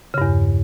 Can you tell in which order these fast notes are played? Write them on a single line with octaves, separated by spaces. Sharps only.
C#3 G2 E2